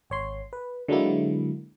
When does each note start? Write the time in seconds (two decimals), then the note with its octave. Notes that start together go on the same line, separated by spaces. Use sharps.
0.10 G#1 C#5 C6
0.53 B4
0.88 D3 F#3 G#3 A#3 E4